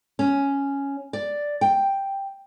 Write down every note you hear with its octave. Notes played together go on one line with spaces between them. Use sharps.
C#4
D5
G5